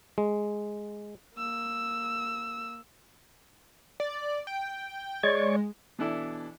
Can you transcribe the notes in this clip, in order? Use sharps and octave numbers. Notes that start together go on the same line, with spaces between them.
G#3
A#3 E6
D5
G5
G#3 C#5 D5 C#6
B2 E3 D4 E4 A4 D5